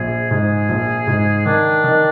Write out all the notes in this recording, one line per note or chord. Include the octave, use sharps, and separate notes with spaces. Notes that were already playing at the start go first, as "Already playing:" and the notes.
Already playing: A#1 G#4
G#2 G#4
A#1
G#2
D#3 D4
D#3